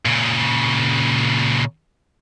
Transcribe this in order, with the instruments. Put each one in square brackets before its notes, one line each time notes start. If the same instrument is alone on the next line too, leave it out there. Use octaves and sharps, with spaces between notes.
[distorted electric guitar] A#2 C#3